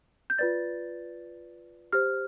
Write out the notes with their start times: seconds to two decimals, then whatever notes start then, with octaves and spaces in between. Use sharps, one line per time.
0.30 G6
0.38 F4 B4 D5 A6
1.93 G4 C5 F6